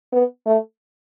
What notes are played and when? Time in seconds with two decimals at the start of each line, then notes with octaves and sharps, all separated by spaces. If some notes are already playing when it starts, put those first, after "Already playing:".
0.13 B3
0.46 A3